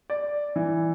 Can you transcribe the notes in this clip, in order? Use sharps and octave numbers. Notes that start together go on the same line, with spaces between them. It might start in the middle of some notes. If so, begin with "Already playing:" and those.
D5
E3